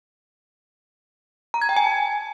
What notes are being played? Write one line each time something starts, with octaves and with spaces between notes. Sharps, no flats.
A#5
G#6
G5
G#5
A5